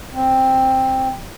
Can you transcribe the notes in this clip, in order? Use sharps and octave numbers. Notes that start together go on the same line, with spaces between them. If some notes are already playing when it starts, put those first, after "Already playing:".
C4